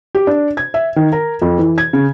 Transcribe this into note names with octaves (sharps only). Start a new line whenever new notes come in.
G4
D4
G#6
E5
D#3
A#4
F2
E3
G#6
C#3